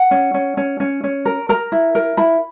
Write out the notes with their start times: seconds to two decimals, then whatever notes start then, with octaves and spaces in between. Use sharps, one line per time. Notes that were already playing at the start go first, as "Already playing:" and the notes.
Already playing: F#5
0.11 C#4
0.34 C#4
0.57 C#4
0.80 C#4
1.04 C#4
1.25 A#4
1.49 A#4 A#5
1.72 E4
1.95 A#4
2.17 E4 B5